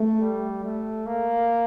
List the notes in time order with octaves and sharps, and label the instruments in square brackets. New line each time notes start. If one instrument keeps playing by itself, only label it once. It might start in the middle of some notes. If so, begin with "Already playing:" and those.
Already playing: [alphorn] A3
[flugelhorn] G3
A3
A#3